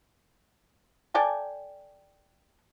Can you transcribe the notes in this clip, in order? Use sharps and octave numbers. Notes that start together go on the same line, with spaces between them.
A4 D5 G5 G#5